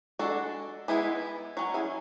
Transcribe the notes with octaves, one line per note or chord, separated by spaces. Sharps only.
G#3 D4 F#4 A4
E3 G#3 B3 E4 G#4
F#3 C#4 F#4
E4 G#4